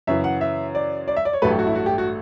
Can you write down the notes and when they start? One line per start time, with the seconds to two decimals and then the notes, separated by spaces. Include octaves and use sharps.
0.07 F#2 C#3 E3 E5
0.24 F#5
0.41 E5
0.75 D5
1.08 D5
1.16 E5
1.25 D5
1.33 C#5
1.42 A1 G2 F#3 A3 B4
1.50 G4
1.59 F#4
1.67 E4
1.75 F#4
1.86 G4
1.98 F#4